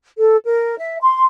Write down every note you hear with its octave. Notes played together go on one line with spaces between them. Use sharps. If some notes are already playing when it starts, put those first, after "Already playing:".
A4
A#4
E5
C6